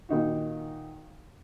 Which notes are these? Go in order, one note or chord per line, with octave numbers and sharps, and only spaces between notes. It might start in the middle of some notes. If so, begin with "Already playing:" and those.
A#2 D#3 D#4 F#4